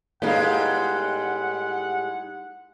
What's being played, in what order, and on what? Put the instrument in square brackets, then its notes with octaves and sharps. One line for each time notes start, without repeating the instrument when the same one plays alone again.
[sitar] A2 G3 G#3 [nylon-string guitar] B3 D#4 F5 [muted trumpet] F#5